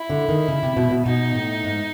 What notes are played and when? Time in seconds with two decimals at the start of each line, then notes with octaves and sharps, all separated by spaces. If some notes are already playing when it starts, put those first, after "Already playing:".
Already playing: E4
0.10 D3
0.29 D#3
0.48 C#3
0.63 C3
0.77 B2
0.91 B2
1.06 B2 D#4
1.35 A2
1.64 G#2